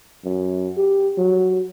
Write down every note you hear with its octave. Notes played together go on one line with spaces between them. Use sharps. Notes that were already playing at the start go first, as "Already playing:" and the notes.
F#2
G4
F#3